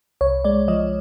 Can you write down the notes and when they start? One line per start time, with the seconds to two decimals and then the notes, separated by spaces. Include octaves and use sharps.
0.21 C2 C#5
0.44 G#3 D5
0.68 F3 D#5